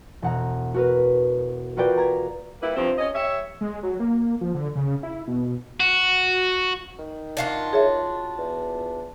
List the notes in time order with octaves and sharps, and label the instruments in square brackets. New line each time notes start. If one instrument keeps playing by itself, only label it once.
[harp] E1 F#5 A#5
F#4 A#4 B4
F4 F#4 A#4 B4 D5 G5
A#5 G#6
[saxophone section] G3 A#3 E4 B4
G2 C3 F3 C4
C#4 C#5 D#5
G4 C#5 E5
[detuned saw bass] G#3
F#3
A#3
F3
D3
C#3
E4
B2
[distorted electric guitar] F#4
[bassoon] D#3
[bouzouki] D4 F4 F#4
[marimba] G#4 C#5 E5
[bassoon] E2